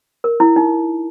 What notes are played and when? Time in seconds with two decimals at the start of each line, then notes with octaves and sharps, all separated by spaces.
0.24 A#4
0.40 E4
0.56 D#4